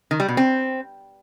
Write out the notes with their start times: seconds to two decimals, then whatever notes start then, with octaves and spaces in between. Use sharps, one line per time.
0.11 D#3
0.20 G3
0.28 B2
0.37 C4